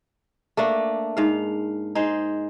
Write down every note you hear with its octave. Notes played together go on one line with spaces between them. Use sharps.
A3 A#3 D4
G#2 F5
D#4 G#4 C5